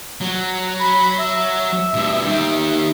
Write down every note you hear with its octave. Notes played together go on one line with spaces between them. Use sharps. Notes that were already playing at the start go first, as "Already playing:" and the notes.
F#3
B5
E5
G2 B2
D#3 G4